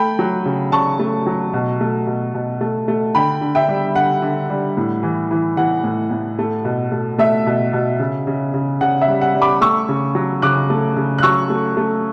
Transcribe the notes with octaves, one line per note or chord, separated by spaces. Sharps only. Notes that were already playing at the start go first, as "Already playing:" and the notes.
Already playing: A3 G5 B5
F#3
C#3
C#3 A5 C#6
A3
F#3
B2
A3
B2
B2
A3
A3
D3 G5 B5
D3
E5 G5
G3
D3 F#5
D3
G3
A2
E3
E3
E3 F#5
A2
A2
A3
B2
A3
A3 E5
B2
B2
C#3
C#3
C#3
C#3 F#5
E5
G3
F#5
G3
B5 D6
A3 C#6 E6
C#3
F#3
C#3 D6 F#6
A3
C#3
F#6
F#3 C#6 E6
A3
A3